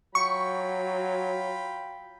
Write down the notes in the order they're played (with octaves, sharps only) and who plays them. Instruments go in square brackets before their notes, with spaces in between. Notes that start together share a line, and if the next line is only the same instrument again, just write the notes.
[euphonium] F#3 [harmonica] F4 G5 B5 [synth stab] C#6